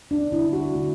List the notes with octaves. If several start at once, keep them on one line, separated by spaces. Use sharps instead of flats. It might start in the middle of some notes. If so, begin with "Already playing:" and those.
D4
D3 G3 E4
F#4
D3 A3